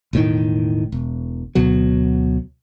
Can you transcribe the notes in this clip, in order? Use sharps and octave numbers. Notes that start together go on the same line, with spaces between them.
E1 A2 D#3
E1
D2 B2 F#3